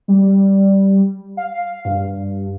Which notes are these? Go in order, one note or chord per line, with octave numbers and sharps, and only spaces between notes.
G3
F5
G2